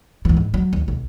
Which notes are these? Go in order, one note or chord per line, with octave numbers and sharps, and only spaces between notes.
F#2 E3
G#2
F#3
D#2
B1